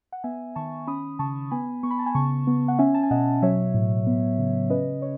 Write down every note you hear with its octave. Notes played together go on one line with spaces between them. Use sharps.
F#5
B3 E5 G#5
D#3 A5 C#6
C#4 B5 D#6
C#3 A5 C#6
B3 G#5 B5
B3 C#6
B5
A5
G#5 B5
C#3 A5 C#6
B3
F#5
C#4 E5 G#5
A5
G#5
B2 D#5 F#5
F#3 C#5 E5
A2
B3
C#3
C#4 B4 D#5
C#5